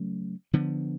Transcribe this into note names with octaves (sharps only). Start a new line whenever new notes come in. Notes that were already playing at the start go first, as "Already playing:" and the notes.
Already playing: C#3 F#3 A3 C#4
D3 F3 B3